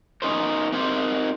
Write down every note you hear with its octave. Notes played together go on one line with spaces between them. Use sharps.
C#4 D#4 A#4 C5
C4 D#4 G4 A#4 C5